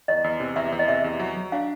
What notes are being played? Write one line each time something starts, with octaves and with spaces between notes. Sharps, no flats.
E2 D#5
E2
C3
E2 E5
E2
D#5
C3 E5
E2
F#3
F#3
D4 F5